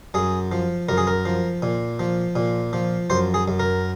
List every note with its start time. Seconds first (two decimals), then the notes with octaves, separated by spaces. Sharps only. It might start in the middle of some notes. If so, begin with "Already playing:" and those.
0.14 F#2 G#4
0.52 F3
0.89 F#2 A#4
0.98 G#4
1.07 A#4
1.25 F3
1.62 A#2
1.99 F3
2.36 A#2
2.73 F3
3.10 F#2 C5
3.34 G#4
3.48 F#2
3.60 A#4